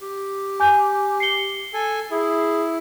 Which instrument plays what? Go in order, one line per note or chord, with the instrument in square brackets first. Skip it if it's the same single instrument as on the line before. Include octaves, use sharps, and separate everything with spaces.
[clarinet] G4
[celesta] G#5 D6 G6
C7 C#7 G7
[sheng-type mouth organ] A4 G#5
[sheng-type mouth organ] E4 [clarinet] G#4